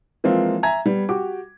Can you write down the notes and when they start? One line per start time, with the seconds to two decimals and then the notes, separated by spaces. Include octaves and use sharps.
0.24 E3 F3 G#3 A#3 C4 F4
0.63 E5 G#5 A#5 G#6
0.86 G3 B3
1.09 F#4 G4 D6